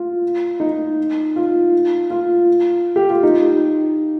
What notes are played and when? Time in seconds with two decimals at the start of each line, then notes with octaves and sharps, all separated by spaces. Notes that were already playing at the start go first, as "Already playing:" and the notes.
Already playing: F4
0.60 D#4
1.36 F4
2.10 F4
2.96 G4
3.10 F4
3.23 D#4